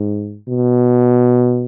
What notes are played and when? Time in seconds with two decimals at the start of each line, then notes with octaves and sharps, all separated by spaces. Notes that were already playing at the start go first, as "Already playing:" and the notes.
Already playing: G#2
0.48 B2